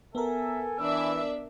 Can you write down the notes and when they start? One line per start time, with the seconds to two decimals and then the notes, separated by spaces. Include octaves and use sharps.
0.15 B3 A4 A#4 E5 G#5
0.79 E3 D4 D5 E5 E6